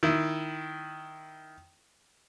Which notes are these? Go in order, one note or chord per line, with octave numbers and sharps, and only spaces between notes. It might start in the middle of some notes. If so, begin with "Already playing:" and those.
D#3 E4